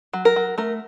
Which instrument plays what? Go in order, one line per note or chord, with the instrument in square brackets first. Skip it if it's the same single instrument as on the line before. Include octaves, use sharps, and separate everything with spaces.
[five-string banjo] F#3
A#4
F#3
A3 A#4